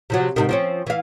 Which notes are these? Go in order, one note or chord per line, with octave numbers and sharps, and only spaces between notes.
C3 F3 F#3
G#2 C3 D#3
F3 C4 C#4
E3 F5